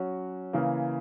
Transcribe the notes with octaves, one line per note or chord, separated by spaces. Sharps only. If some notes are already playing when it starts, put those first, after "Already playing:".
Already playing: F#3 C#4 F#4
C#3 E3 A#3